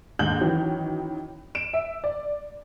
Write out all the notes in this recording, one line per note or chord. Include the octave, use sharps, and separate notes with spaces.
D#2 G#2 D3 G6 F#7
D#3 E3 F#3 C#4
D7 E7
E5
D5